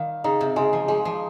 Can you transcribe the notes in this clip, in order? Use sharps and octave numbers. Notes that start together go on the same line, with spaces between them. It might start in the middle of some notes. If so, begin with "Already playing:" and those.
Already playing: D#3 G3 F5
C#3 D#4
C3
C#3 G#3
F3
G3 G#3
F3